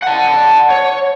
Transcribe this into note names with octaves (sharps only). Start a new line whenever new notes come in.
F#5 A5
C#5